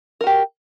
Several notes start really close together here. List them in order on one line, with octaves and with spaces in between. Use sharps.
A#4 F#4 G4